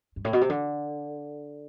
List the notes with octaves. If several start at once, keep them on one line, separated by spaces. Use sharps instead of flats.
G2
A2
B2
C3
D3